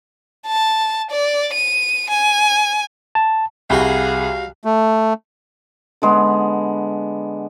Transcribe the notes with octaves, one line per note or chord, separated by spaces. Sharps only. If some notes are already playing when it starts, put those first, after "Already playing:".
A5
D5
D#7
G#5
A5
C2 G3 F#4 G#4 F5
A3
D3 G#3 B3